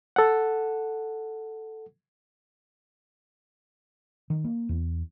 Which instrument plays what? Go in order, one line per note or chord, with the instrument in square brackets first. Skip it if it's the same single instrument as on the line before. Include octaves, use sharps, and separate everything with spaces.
[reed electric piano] A4 F#5
[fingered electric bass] D#3
A#3
E2